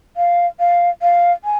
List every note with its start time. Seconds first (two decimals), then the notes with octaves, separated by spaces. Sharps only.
0.17 F5
0.59 F5
1.02 F5
1.44 G#5